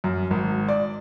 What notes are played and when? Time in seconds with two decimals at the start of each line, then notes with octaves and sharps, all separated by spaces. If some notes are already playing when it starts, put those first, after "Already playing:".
0.04 F#2
0.31 G#1
0.69 D5